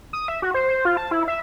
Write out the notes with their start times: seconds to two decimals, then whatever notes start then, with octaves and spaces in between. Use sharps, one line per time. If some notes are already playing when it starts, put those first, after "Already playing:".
0.13 D#6
0.28 E5
0.42 F#4
0.54 C5
0.69 C5
0.85 F4
0.97 A5
1.11 E4
1.28 E5